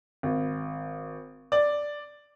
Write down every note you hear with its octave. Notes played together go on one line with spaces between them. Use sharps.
G#1
D5